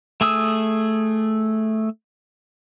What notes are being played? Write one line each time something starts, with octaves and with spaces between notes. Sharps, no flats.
A3 G#4 D#6 E6